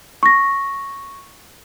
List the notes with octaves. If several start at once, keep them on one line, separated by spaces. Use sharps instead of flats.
C#6 A#6